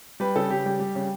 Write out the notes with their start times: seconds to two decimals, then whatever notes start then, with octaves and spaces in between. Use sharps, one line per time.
0.20 G3 B4
0.36 C#3 A4
0.50 C#3 G4
0.66 G3
0.80 G3
0.95 C#3